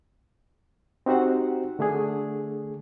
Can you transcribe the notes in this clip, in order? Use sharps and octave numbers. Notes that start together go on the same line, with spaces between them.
C4 D#4 F#4 G4 C5 F#5
D3 A3 D4 G#4